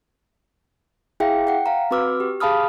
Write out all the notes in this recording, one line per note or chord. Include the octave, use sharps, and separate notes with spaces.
E4 G#4 E5 F5 G5
F#5 G5
F5 A#5
C4 F#4 B4 D6 E6 F6
G4
G#4 F5 A5 B5 D#6 F6